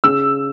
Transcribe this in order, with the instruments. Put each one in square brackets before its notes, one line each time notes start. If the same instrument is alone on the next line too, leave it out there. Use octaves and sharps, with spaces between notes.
[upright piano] C#3 E6